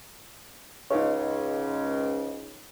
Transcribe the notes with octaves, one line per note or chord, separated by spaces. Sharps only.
C#2 G#2 C#3 D#4 C#5